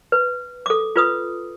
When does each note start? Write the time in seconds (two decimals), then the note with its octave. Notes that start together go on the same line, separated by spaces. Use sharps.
0.12 B4
0.66 A4 D6
0.96 F4 B4 D#6